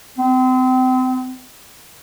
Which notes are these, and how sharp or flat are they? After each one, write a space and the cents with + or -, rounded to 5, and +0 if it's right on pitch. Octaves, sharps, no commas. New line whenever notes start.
C4 -35